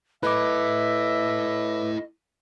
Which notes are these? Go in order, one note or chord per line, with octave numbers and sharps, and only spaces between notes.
E4 A4 B4 D#5 E5 D6